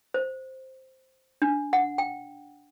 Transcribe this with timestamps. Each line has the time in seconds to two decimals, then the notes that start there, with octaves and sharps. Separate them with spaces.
0.14 C5
1.42 D4
1.73 F#5
1.98 G5